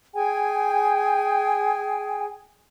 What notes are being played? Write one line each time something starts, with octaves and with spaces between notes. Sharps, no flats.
G#4 G5 G#5